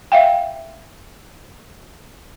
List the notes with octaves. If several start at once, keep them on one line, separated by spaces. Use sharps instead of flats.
E5 F5 G5